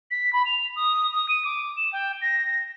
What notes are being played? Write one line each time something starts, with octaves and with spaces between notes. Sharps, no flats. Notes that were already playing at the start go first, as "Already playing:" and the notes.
B6
B5
F7
D#6
D#6
D#7
D6
E7
G5
A#6